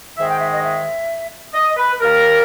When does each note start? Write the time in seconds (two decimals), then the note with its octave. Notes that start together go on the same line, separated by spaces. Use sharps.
0.17 G#2 D#3 G#3 E5
0.29 G5
0.40 E5
0.52 D#5
0.63 E5
1.54 D#5
1.77 B4
2.00 D#2 D#3 G3 A#3 A#4